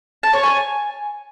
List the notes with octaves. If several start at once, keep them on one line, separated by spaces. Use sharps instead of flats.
A5
C#5
G#5